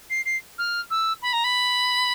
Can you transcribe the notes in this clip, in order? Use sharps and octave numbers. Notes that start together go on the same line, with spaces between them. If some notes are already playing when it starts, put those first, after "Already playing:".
C7
C7
F6
E6
B5
A#5
B5